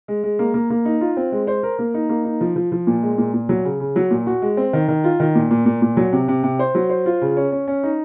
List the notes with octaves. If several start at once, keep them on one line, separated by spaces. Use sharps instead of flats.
G#3
G#3
A#3
A#3
A#3
D#4
F4
C4
G#3
C5
A#4
A#3
D#4
A#3
D#4
F3
F3
F3
A#2
G#3
A#2
A#2
F#3
C#3
C#3
F#3
A#2
F#4
G#3
C4
D#3
D#3
F4
D#3
A#2
A#2
A#2
A#2
F#3
C3
C3
C3
C5
F#3
C5
F4
C#3
C#4
C#4
C#4
D#4